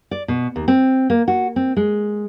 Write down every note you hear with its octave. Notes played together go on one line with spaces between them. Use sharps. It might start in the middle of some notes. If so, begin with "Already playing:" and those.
D5
B2
D#2
C4
A#3
F#4
C4
G#3